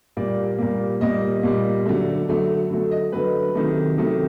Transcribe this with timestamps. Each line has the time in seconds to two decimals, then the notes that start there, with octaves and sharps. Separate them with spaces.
0.17 A#2 G3 A#3 D5
0.58 A#2 G3 A#3
1.01 A#2 G3 A#3 D#5
1.43 A#2 G3 A#3
1.86 D3 F#3 A3
2.28 D3 F#3 A3
2.70 D3 F#3 A3
2.91 D#5
3.12 D3 F#3 A3 B4
3.55 C3 D#3 F#3 A3
3.98 C3 D#3 F#3 A3